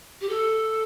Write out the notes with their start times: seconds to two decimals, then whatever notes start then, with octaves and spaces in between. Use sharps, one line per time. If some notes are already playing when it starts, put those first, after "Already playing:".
0.21 G4
0.29 A4